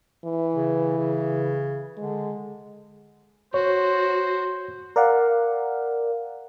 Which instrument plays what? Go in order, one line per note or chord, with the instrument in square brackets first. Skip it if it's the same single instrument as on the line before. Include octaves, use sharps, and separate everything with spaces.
[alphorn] E3
[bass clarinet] C#3
C#3
[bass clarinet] D3 [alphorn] G#3
[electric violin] F#4 [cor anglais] C5 [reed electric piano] C#5
[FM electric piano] A#4 D5 F5 F#5